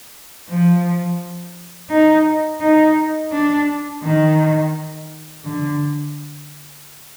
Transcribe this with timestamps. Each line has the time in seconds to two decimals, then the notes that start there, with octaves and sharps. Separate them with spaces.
0.49 F3
1.90 D#4
2.61 D#4
3.32 D4
4.03 D#3
5.45 D3